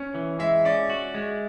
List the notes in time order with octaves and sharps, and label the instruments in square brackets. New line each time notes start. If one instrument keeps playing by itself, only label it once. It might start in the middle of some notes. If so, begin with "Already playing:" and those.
Already playing: [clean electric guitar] C#4
E3
[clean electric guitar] G#3 [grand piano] E5
[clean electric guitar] C#4 [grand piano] D5
[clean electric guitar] F#4
G#3